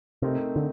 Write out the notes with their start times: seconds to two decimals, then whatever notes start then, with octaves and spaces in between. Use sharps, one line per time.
0.22 C3 A3 C4 D#4 A#4
0.56 D3